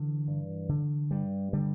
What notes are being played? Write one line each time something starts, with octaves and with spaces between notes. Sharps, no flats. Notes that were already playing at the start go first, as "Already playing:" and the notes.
Already playing: D3 E3
G2
D3
G2 G3
D3 G3